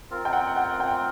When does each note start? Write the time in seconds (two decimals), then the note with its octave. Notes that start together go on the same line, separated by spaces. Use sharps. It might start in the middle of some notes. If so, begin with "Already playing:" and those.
0.10 C4 F4 A#4
0.25 G5
0.33 F#5
0.56 F#5
0.80 G5